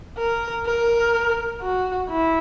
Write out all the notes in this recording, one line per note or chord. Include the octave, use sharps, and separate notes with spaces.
A#4
A#4
F#4
E4